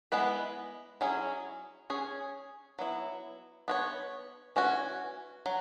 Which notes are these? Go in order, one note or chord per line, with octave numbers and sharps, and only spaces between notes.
G#3 B3 E4 B4
F#3 C#4 E4 G#4
C#4 G#4 C#5
F#3 B3 E4
B3 F#4 C#5
E3 C#4 F#4
F#3